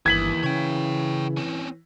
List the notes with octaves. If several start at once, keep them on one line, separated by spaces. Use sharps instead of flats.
G1 D#2 E3 G#6 B6 F#7
C#3 C#5 G5
C4 C#4